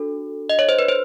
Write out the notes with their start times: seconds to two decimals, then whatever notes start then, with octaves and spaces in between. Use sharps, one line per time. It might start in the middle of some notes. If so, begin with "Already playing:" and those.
Already playing: D4 F#4 A4
0.50 D#5
0.59 C#5
0.69 C5
0.79 B4
0.89 C5